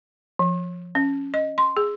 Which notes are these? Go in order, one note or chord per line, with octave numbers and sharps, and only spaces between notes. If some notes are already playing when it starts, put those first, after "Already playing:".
F3
C#4
D#5
C6
G#4